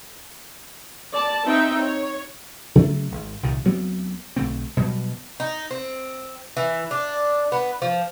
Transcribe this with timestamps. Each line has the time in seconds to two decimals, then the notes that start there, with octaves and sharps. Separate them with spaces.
1.13 D5 A5
1.44 C4 D#4 E5 G5
1.80 C#5
2.75 C#3 F#3 A3 A#3
3.12 G#1
3.43 C2 A#2 D#3
3.65 D2 F#3 B3 C4
4.36 B1 D3 A3 C4
4.77 B2 F#3 G3
5.40 D#4
5.71 C4
6.57 E3
6.91 D4
7.52 B3
7.82 F3